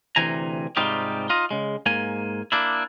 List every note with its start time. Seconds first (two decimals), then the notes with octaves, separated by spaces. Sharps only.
0.16 D2 C3 E3 G#5 A#5
0.77 G#2 C3 G3 D#4 F4 G4
1.29 D#4 F4 D#5
1.51 C#3 G#3
1.86 G#2 A#3 G#5
2.52 A#3 D4 E4